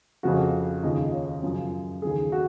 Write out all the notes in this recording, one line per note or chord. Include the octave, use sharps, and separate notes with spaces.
F2 C#3 F3 F#4
D#2 C#3 F3 D#5
C#5
F#2 C#3 F3
D#2 C#3 F3 G#4
F#4